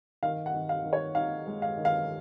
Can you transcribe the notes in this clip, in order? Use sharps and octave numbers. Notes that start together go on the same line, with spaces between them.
D#3 F5
F#5
D#3
F5
D#3
C#5
D#4 F5
G#3
F5
D#3
F5